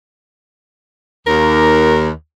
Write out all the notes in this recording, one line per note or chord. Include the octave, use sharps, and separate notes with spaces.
D#2 A#4